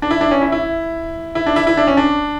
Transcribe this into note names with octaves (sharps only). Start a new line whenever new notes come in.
D4
E4
D4
C#4
E4
E4
E4
D4
E4
E4
D4
C#4
D4